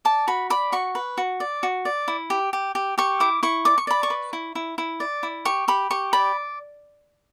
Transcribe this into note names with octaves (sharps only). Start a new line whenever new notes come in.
D5 A5
F#4 B5
D5 B5
F#4 C#6
B4
F#4
D5
F#4
D5
E4
G4
G4
G4
G4 C#6
E4 D6
E4 C#6
D5 D6
C#6
D5 B5
C#6
B4
E4
E4
E4
D5
E4
G4 C#6
G4 B5
G4 C#6
D5 B5